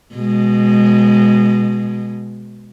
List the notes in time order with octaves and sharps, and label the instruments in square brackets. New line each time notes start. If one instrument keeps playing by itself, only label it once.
[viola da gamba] B2 G#3